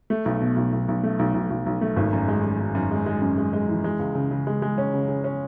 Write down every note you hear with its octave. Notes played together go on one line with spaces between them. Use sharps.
A3
B1
B2
B1
B1
B1
A3
B1
B1
B1
B1
A3
G#1
F#2
G#3
G#3
F#2
F#2
G#3
G#3
F#2
G#3
G#3
E3
G#3
C#2
C#3
C#3
G#3
G#3
C#4
C#3
C#3
C#4